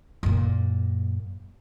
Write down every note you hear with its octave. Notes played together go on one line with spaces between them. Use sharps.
F#2 A#2